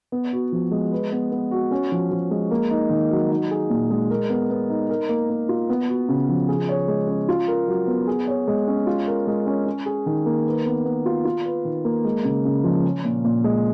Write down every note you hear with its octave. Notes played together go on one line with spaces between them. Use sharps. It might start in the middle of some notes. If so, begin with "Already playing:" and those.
B3
F#4
F3
G#3
B4
B3
B3
F#4
C#4
F3
F3
G#3
A#3
D#4
D#3
F#3
D#4
G#4
A#2
G#3
A#4
B3
B3
D#4
A#4
A#3
A#3
F4
B3
F#4
C#3
F3
G#4
C#5
G#3
C#4
F4
A#4
F#3
B3
G#4
C#5
G#3
C#4
F4
A#4
G#3
C#4
C#4
G#4
D#3
A#3
B4
B3
B3
F4
F4
B4
D#3
A#3
G#3
C#3
C#3
F3
C#4
A#2
A#2
G#3